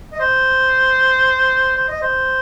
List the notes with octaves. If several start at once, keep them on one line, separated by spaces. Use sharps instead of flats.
D#5
C5
C5
D#5
C5